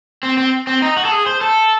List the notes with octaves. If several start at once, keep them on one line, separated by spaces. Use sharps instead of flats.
C4
C4
C4
D#4
F#4
A4
G#4
C5
A4